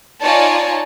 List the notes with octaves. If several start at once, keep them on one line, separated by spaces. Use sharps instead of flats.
D#4 F4 C#5 D5 G#5 A5